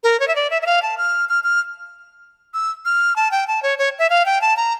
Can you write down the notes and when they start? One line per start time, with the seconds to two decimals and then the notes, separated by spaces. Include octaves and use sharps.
0.04 A#4
0.20 C#5
0.28 E5
0.36 D5
0.50 E5
0.62 E5
0.66 F5
0.82 A5
0.98 F6
1.29 F6
1.44 F6
2.54 E6
2.85 F6
3.16 A5
3.31 G5
3.47 A5
3.63 C#5
3.79 C#5
3.99 E5
4.10 F5
4.26 G5
4.41 A5
4.57 A#5